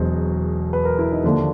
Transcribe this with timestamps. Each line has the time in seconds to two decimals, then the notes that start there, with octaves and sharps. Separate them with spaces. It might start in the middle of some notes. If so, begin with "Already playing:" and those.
Already playing: E1 E2 B2 F#3 C5
0.73 B4
0.85 A#4
0.99 E4
1.12 D#4
1.24 D#2 D3 F3 D4